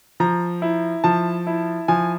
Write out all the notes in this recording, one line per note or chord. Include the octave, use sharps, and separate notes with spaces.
F3 A#5
E4
F3 A5
E4
F3 G#5